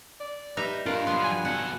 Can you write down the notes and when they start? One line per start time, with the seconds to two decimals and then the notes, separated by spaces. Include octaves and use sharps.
0.20 D5
0.57 G3 D#4 B4 E5 A#5
0.86 G2 D4 F4 A#4
1.07 D3 F#3 B3 C6
1.24 G#5
1.45 B2 A4 F#5